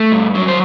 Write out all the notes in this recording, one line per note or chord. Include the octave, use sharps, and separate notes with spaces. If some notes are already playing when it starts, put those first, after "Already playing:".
Already playing: A3
G2
F#3
C5